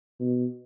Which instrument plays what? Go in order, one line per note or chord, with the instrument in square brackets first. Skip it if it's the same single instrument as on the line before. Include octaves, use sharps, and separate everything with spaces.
[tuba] B2